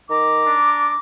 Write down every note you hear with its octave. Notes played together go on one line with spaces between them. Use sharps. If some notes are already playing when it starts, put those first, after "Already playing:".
D#3 A#5 D6
D4